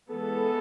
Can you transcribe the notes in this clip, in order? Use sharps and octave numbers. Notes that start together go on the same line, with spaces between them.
E3 G#3 B3 A4